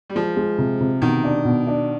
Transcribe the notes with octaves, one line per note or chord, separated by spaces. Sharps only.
G3
F3 G#3
G#3
C3
C3
B2 D#3
D4
B2
D4